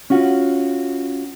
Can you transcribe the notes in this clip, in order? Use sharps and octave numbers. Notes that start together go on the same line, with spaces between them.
C#4 F4 F#4